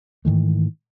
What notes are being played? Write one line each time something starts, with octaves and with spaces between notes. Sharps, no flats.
G#2 D#3 E3 A3